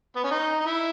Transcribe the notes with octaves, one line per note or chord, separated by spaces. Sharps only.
B3
C#4
D#4
D#4
E4